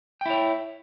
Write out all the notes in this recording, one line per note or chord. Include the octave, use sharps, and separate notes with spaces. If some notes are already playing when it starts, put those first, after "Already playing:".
E4 C#5 G5